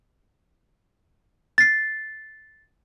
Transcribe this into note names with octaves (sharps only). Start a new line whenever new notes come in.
A6 C7